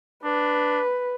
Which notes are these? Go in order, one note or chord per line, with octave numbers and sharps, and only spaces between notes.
D4 B4